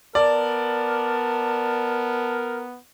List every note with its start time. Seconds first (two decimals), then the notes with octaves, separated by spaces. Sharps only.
0.15 B3 A#4 D5 A5